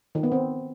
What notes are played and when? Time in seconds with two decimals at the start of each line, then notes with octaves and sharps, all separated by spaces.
0.15 D#3
0.23 B3
0.32 C4